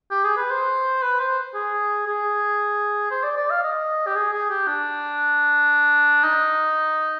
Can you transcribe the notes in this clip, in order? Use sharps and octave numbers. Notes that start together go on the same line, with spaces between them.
G4
G#4
B4
C5
B4
C5
G#4
G#4
C5
D5
D5
F5
D#5
G4
G#4
G#4
G4
D4
D#4